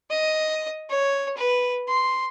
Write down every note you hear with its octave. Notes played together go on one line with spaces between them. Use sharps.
D#5
C#5
B4
C6